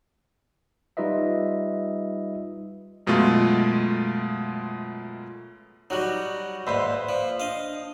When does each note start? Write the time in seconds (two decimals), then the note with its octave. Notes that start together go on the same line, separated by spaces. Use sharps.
0.97 G3 D#4 F4 B4 D#5 E5
3.07 F#2 B2 G#3 A3 F4
5.90 F#3 G3 D#4 F#4
6.67 D#2 G#2 B4 C5 D5 E5
7.09 F3
7.40 D4 D#5 F5